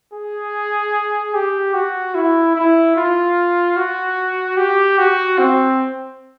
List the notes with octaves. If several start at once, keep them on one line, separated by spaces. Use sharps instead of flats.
G#4
G4
F#4
E4
E4
F4
F#4
G4
F#4
C4